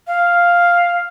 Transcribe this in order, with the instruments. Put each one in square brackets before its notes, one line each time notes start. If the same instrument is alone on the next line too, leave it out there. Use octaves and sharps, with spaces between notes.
[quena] F5